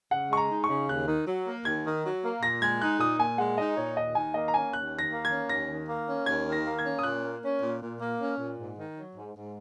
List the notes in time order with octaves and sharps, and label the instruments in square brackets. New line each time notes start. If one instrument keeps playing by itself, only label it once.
[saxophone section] C#3 [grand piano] F#5
[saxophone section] G#3 [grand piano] C#6
[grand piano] A#5
[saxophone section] D#4
[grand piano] C#6
[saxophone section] C#3
[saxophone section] D#2 [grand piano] F#6
[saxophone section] D#3
F#3
A#3
[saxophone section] D#2 [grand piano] G#6
[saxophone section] D#3
F#3
A#3
[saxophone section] A#2 [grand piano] A#6
[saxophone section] G#3 [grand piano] G#6
[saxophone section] D#4 [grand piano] F#6
[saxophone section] A#2 [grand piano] D#6
[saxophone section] A#2 [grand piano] G#5
[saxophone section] G#3 [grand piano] F#5
[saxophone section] D#4 [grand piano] D#5
[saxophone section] A#2 [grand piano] C#5
[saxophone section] D#2 [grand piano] D#5
[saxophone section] D#3 [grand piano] G#5
[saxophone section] A#3 [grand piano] D#5
[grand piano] A#5
[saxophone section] C#4 [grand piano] G#5
[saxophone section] D#2 [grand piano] F#6
[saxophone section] D#3
[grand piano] A#6
[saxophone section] A#3
[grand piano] G#6
[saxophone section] C#4
[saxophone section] D#2 [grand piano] A#6
[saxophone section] D#3
A#3
C#4
[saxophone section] D#2 [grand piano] G#6
[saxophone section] D#3
[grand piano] A#6
[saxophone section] A#3
[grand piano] G#6
[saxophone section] C#4
[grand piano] D#6
[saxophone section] A#2 [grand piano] F#6
[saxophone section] A#3
C#4
A#2
A#2
A#3
C#4
A#2
G#2
D#3
F#3
G#2
G#2